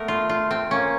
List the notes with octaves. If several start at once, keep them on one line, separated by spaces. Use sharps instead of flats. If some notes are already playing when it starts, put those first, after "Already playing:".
Already playing: A3 B3 A#4
F4
F4
C4
A#3 C#4